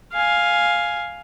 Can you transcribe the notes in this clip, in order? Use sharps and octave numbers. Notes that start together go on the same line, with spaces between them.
F5 G#5